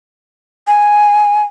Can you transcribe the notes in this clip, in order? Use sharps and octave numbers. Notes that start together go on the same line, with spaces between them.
G#5